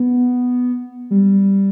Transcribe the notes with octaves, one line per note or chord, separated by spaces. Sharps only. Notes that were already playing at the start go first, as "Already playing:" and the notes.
Already playing: B3
G3